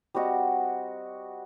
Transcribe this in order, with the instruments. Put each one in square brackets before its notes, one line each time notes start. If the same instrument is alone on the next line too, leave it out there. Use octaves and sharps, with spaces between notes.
[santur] G3 C4 F#4 D#5